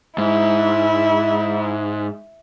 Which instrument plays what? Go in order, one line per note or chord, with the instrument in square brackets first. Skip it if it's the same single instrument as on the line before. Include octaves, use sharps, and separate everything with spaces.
[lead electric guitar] G#2 [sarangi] E4